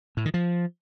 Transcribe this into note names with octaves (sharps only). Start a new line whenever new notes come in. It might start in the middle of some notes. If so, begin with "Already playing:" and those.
A2
D#3
F3